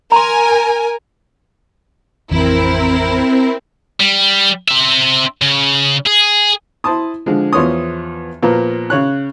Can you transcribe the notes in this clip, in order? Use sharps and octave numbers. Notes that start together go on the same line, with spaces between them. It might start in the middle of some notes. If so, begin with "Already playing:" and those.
A#4 G#5 A#5 C6
A1 F2 E3 C4 E4 A#4
G3
C4 E5
C#3
G#4
E4 C5 A5 D#6
D3 F3 G#3
E2 F3 B3 C#5 C6 D#6
A#2 F3 A#3 B3
C#3 C#5 F#6